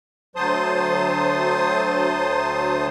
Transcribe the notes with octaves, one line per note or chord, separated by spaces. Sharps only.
D2 F#3 C5 A5 C6 D#6